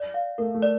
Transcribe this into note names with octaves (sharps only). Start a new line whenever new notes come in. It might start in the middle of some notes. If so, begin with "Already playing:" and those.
Already playing: D5
F5
A3 A#4
A3
D5